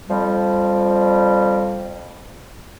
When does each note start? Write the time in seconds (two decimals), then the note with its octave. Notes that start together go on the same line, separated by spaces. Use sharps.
0.08 F2 F3 G3